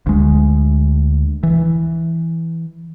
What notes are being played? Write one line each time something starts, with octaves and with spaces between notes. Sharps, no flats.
D2 G#3
E3